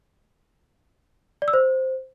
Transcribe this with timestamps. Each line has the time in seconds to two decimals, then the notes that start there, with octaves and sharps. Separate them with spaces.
1.42 D5
1.48 E6
1.53 C5